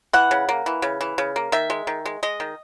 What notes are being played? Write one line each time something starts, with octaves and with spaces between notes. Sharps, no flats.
E3 F#5
C#3
A#3
E3
C#3
E3
C#3
A#3
D#3 E5
G#3
D#3
G#3
G#3 D#5
D#3